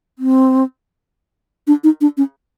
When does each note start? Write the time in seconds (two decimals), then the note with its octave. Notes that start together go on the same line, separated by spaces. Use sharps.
0.19 C4
1.67 D4
1.84 D#4
2.01 D4
2.17 C#4